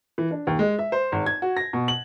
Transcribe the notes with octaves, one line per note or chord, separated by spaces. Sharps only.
E3
D4
D#2
G#3
E5
C5
G#1
G#6
F#4
A#6
B2
F#7